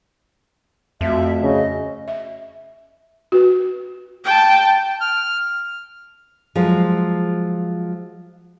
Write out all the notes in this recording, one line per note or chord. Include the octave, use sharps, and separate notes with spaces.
F2 A3 F#4 E5
C#3 D#5
E5
F#4 B4
G5 A5
F6
F3 F#3 G#3 F4 C5